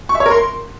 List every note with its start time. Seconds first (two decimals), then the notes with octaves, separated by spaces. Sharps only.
0.09 C#6
0.15 E5
0.20 C#5
0.26 A#4
0.31 C6